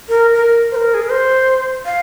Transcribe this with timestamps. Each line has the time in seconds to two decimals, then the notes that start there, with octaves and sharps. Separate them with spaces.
0.09 A#4
0.34 A#4
0.72 C5
0.76 A#4
0.94 G#4
1.02 A#4
1.10 C5
1.86 F5